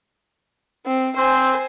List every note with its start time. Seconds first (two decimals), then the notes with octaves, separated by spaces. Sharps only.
0.86 C4
1.17 C4 C5 G#5